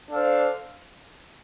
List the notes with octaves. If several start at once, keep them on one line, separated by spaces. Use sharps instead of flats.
D4 A4 C5 F5